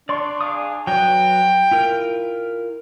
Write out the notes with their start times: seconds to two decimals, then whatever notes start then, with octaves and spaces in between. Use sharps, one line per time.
0.09 D4 D5 C6 C#6
0.41 G#4 F5 D#6
0.87 F#3 B4 G5
1.71 E4 F4 A#4